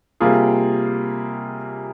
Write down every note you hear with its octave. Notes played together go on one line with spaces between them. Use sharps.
C3 G3 A#3 F4 G#4